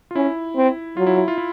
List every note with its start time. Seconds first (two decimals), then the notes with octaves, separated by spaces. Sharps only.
0.11 F4
0.15 C#4 E4
0.56 C4
0.97 F#3 F4
1.07 E4
1.17 E4
1.28 F4
1.38 E4